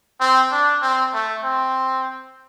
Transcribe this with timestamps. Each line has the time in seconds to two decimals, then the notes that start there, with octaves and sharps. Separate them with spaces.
0.20 C4
0.51 D4
0.82 C4
1.13 A3
1.44 C4